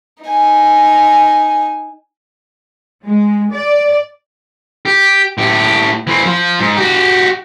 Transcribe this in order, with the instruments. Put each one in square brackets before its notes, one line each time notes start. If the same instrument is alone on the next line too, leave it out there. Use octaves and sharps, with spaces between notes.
[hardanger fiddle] D#4 G#5
[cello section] G#3
D5
[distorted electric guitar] G4
A2 G4
E3 C4
F3
G#2
F#4 G4